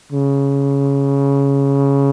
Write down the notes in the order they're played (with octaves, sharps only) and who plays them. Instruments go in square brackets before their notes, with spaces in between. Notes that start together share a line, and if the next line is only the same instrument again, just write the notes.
[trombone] C#3